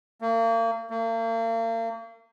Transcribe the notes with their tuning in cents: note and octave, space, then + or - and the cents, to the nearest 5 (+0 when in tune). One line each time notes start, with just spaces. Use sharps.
A#3 -35
A#3 -40